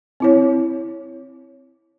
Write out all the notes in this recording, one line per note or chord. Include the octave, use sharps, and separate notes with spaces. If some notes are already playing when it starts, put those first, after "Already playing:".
C4 E4 C#5